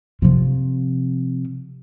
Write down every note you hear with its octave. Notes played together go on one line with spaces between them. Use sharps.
C3 F3